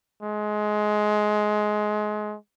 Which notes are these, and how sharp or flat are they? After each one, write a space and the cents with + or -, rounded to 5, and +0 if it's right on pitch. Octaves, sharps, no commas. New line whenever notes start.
G#3 +20